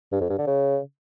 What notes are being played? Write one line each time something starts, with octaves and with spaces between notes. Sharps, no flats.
G2
F2
G2
D3
C#3